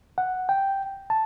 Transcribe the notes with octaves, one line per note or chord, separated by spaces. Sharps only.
F#5
G5
A5